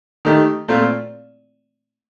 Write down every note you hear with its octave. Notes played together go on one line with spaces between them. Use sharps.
D#3 A3 D#4 G4
A#2 A3 C4 F4